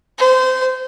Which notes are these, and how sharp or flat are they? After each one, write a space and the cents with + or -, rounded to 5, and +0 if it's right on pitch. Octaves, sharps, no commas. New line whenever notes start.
C5 -25